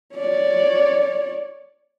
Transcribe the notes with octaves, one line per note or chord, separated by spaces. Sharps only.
C#5 D5